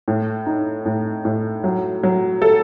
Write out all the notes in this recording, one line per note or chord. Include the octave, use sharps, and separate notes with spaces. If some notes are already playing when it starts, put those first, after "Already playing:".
A2
D#4
A2
A2
F#3
F#3
A4